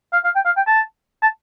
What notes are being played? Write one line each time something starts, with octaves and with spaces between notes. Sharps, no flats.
F5
F5
G5
F5
G5
A5
A5